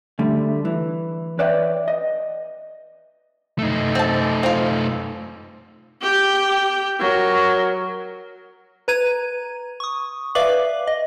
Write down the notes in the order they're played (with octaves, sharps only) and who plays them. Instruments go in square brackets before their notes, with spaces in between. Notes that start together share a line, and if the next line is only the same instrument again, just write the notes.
[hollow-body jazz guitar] D2 D3 G3 A3
E3
B4 C#5 D5 E5 F#5 G5
D#5
[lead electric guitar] A3 D#4
[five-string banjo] C4 A5
C4 F4
[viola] G4 G5
F#3 A#4
[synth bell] B4 A#5 G#6 D#7
C#6 D#6
B4 D5 E5 F5 D6 F#7
D#5